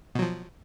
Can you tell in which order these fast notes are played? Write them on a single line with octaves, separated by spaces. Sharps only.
B2 F#3 F3